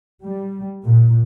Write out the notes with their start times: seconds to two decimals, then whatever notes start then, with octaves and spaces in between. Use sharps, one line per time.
0.24 G3
0.84 A#2